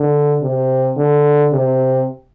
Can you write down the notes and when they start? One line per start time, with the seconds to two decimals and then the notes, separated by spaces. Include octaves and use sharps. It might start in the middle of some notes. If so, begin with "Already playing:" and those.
Already playing: D3
0.42 C3
0.97 D3
1.53 C3